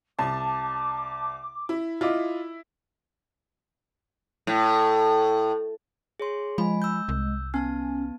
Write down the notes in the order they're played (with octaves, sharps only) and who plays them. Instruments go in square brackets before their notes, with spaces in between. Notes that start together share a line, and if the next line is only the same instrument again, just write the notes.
[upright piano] C2 [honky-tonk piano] A5 [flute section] D6
[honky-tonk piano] E4
[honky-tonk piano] E4 [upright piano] F4 D#5 D6
[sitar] A2
[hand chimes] G#4 C#5 C6
[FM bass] F3 [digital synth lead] G#3 [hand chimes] G#5 B5
[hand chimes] E6 G6
[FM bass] C2
[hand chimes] B3 A5 [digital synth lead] C#4